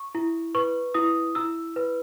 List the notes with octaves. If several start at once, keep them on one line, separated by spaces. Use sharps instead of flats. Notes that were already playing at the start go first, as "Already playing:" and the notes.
Already playing: C#6
E4
B4 C#6
E4 D#6
E4 E6
B4